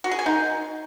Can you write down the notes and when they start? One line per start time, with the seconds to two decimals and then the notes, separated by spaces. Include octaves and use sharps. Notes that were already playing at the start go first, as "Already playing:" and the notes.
0.04 F#4
0.11 G#4
0.19 G#5
0.26 D#4